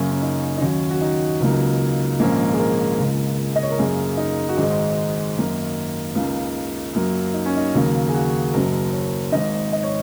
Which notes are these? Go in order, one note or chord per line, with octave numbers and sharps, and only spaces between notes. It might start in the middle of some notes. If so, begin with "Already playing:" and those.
Already playing: F#2 C#3 A#3 C#4
C#4
D#4
D#4
D#2 D#3 F#3 C#4
F#4
D#4
C#2 C#3 F#3 A#3
A#1 G#2 D#3 A#3 C#4
G#4
A#4
C#2 C#3 G#3
D#5
C#5
A#4
F#2 C#3 A#3 G#4
D#4
F#4
G#1 G#2 G#3 D#4
F#2 D#3 A#3
C#2 C#3 A#3
F#2 F#3 A#3
D#4
C#4
D#4
D#2 C#3 F#3 A#3
G#4
F#4
F#1 F#2 F#3 A#3 A#4
C#5
G#1 G#2 D#3 D#5
D#5
C#5